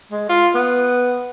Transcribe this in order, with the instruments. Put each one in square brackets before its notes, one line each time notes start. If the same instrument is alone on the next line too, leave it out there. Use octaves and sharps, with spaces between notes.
[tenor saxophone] G#3
F4
B3